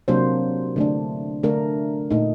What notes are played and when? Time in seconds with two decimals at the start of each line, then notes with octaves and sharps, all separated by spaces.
0.08 C3 F#3 A#3 D4 C5
0.76 D3 A3 D4
1.43 D3 A3 D4 A#4
2.11 A#2 A3 D#4